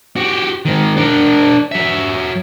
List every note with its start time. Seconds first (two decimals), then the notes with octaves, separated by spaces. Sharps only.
0.16 F#4 G4
0.65 G#2 D#3
0.97 D4 A#4
1.72 F#3 E5